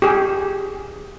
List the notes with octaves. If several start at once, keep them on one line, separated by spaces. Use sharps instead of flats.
G4 G#4